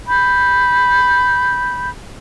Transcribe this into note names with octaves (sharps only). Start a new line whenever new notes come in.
B5 G6